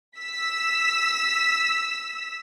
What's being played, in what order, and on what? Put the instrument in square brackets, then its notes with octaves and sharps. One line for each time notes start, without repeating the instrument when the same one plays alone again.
[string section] E6 B6